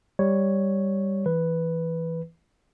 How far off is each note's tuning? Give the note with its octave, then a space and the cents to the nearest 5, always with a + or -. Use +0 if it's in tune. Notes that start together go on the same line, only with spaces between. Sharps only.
G3 +5 C#5 +0
E3 +0 B4 +0